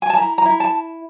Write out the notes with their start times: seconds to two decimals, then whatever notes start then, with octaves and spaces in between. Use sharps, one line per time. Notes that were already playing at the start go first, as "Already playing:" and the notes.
0.02 G#5
0.10 A5
0.17 E4 A#5
0.38 A#5
0.45 E4
0.60 A5